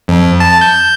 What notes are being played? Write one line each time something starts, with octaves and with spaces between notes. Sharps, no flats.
F2
A5
G6